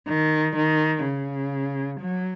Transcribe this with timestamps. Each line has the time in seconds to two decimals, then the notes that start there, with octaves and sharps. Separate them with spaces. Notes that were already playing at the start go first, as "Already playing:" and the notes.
0.09 D#3
0.56 D#3
1.04 C#3
2.00 F#3